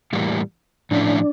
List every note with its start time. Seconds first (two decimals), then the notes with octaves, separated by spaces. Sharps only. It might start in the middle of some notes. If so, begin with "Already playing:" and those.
0.13 A2 E3 G3 A#3
0.91 A2 F3 A3 C#4 D4 E4